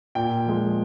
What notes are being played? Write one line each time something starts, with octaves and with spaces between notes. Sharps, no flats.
A#2 G5
F3 G#3